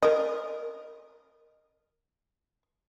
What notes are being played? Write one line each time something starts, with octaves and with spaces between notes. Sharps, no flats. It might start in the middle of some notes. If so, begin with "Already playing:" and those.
A#4 D#5